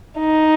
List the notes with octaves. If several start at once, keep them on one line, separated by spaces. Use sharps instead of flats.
D#4